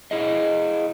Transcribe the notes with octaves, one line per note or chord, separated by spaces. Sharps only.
E4 G#4 D#5